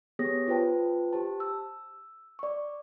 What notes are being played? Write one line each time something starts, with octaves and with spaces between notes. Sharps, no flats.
B3 G4 G#4 C#5 D#6 A#6
F4 B4 C5 G5 A5
G4 C5 A5
E6
D5 C#6